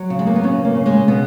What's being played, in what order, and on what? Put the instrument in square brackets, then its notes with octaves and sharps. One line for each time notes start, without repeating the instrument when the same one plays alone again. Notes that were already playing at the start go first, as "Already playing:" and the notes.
Already playing: [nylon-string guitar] F#3
C#3
G#3
A#3
B3
C#3 C#4
A#3
C#3
G#3
B2 B3